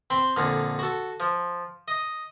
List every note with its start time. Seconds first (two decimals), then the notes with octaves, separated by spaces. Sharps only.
0.10 C4 G5 B5 C6
0.36 F2 A#2 D3
0.79 F#4 A4
1.20 F3
1.88 D#5